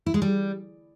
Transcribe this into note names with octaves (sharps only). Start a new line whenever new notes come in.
E4
G#3
G3